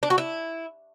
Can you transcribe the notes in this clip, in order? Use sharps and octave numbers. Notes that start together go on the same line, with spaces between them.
D4
F#4
E4